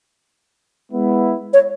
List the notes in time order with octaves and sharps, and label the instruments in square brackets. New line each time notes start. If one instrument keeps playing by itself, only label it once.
[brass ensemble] G#3 B3 E4
[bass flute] C#5